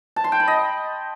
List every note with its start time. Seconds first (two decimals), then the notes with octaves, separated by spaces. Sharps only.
0.16 A5
0.24 C6
0.32 G5
0.40 B5
0.48 D#5